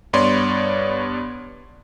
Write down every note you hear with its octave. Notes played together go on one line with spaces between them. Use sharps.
G2 B3 C#5 D5 C6